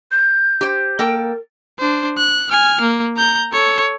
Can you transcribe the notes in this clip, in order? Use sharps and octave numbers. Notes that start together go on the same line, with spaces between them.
G6
G4 C5
A#3 A4 A#4 G5
D4 C5
F#6
G#5 F6
A#3
A#5 G6
A4 C#5